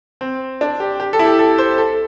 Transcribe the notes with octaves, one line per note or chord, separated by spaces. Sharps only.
C4
D4
G4
G4
A4
E4
G4
A4
C5
A4